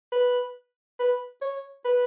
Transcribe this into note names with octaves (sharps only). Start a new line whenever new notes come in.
B4
B4
C#5
B4